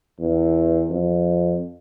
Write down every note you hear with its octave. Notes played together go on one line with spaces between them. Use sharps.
E2
F2